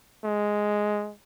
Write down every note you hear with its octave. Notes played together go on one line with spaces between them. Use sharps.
G#3